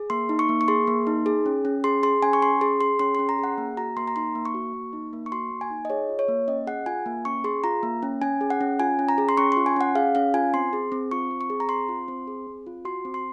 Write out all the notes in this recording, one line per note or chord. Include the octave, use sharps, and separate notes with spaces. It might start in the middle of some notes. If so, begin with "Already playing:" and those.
Already playing: G#4
A#3 C6
D#4
C#6
A#3
C#6
G#4 C6
A#3
D#4
G#4
C#4
C#4
G#4 C6
G#4 C6
C#4 G#5
C#6
C#4 C6
G#4 C6
G#4 C6
C#4 C6
C#4 C6
A#5
G#4 F#5
A#3
F#4 A#5
A#3 C6
A#5
D#4 C6
A#3
C#6
F#4
A#3
D#4
A#3
C#6
F#4 C6
A#3
G#5
D#4
D#5
G#4 C#5
F4
C#5
A#3
C#4 D#5
G#4 F#5
F4 G#5
A#3
C#4 C#6
G#4 C6
F4 A#5
A#3
C#4
C#4 G#5
G#4
F#5
C#4
F4 G#5
C#4
A#5
G#4
C6
C#4 C#6
F4 C6
G#5
C#4 F#5
G#4 F5
C#4 F5
F4 G#5
C4 C6
G#4
C4
F4 C#6
C4
C#6
G#4
A#5
C4 C6
F4
C4
G#4
C4
F4
F#4 C6
C4
C6